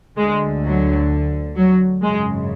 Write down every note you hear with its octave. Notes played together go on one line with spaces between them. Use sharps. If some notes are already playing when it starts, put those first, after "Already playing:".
D2 D3 G#3
F#3
F#3
G#1 F#2 C#3 G#3